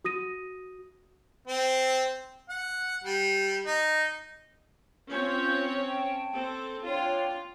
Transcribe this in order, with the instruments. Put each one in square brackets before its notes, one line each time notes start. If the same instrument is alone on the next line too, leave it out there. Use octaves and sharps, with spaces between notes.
[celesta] F#4 D#6 A#6 D#7
[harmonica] C4
F#5
G3
D#4
[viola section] C4 C#4 C#5 [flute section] F4 G6
[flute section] G5 A5
[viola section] C4 A4
[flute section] D4 C#5 G5 [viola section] F4